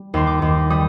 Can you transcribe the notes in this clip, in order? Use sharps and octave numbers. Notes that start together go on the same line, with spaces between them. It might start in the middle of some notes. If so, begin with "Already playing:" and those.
Already playing: G3
D#2 C6
D6
D#2
G3 D#6